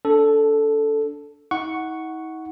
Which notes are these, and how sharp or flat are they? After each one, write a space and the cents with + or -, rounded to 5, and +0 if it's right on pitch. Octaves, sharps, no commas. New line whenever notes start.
D4 -25 A4 +0
D#4 +45 F#5 +0 C#6 +0